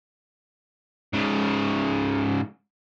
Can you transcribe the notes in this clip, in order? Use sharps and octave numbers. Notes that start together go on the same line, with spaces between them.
G#2 C#3